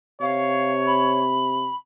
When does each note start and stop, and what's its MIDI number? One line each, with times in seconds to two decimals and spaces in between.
0.21 1.71 48
0.21 1.21 73
0.21 0.72 77
0.86 1.75 83